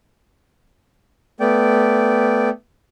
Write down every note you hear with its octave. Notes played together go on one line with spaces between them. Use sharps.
A3 B3 D5 G5